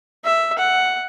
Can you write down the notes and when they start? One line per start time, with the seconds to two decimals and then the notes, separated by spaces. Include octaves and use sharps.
0.24 E5
0.59 F#5